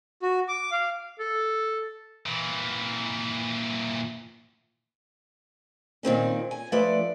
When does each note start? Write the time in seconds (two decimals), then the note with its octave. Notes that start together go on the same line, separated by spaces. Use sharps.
0.22 F#4
0.49 D6
0.71 F5
1.19 A4
2.26 A#2 E3
6.03 A#2 D#3 C4 C#4
6.51 G#5
6.72 F3 A3 D4 B4 D5